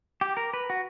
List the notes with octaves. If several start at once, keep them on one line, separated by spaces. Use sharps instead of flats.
G4
A#4
B4
F#4